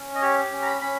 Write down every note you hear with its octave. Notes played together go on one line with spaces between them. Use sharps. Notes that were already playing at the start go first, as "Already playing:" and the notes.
Already playing: C#4
D#5
G4 C#5
C#4
A#5
B5
C#4 B5